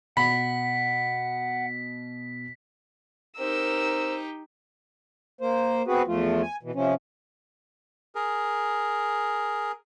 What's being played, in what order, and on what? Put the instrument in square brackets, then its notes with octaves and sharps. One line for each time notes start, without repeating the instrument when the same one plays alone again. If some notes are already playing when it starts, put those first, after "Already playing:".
[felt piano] B2 [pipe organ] F#5 [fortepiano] B5 [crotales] B6
[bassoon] C4 [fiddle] D#4 G4 [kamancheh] A#4 E6
[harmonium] A#3 C5
B3 C4 F#4 G#4 B4
E2 F3 A3 F4
G#5
B2 E3
C3 F3 C#4
[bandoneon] G#4 A#4